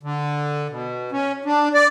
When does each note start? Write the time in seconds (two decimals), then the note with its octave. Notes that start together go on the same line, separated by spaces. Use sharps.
0.03 D3
0.70 B2
1.12 C#4
1.45 D4
1.74 D5